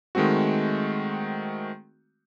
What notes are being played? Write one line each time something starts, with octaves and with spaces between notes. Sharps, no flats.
D#3 G#3 A3 C4 F#4